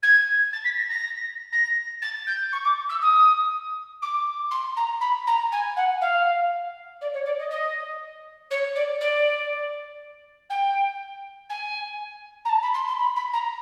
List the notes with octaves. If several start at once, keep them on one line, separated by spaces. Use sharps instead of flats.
G#6
A6
B6
A#6
A#6
A#6
A6
G6
C#6
D6
E6
D#6
D6
C6
A#5
B5
A#5
G#5
F#5
F5
D5
C#5
D5
D#5
D#5
C#5
D5
D5
G5
G#5
A#5
A5
B5
C6
C6
B5
B5
A#5